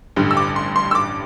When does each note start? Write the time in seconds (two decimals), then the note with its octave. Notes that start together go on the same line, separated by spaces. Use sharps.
0.16 A1 G2 D3 G3
0.31 E6
0.37 D6
0.56 C6
0.76 C6
0.91 E6
0.95 D6